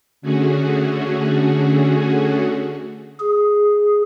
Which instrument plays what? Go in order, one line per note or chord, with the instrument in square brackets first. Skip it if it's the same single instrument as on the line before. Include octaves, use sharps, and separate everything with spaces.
[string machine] D3 A3 C#4 F#4 G#4
[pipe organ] G#4